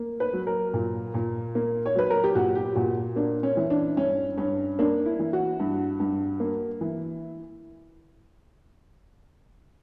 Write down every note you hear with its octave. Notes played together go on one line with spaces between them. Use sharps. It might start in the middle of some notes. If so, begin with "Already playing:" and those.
Already playing: A#3
B4
F#3
A#4
A#2
A#2
A#3
C#5
F#3 B4
A#4
G4
A#2 F#4
G4
A#2 F#4
A#3 D4
C#4
E3
D4
G2 C#4
G2 C#4
A#3 D4
E4
E3
F#4
G2
G2
A#3
E3